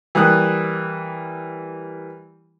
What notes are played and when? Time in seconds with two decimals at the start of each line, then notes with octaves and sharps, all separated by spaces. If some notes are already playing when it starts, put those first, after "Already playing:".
0.15 E3 G3 A#3 D#6 F#6